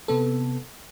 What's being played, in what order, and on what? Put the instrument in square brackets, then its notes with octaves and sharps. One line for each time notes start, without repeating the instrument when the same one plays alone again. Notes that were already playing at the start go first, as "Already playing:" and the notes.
[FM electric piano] C3 B3 A4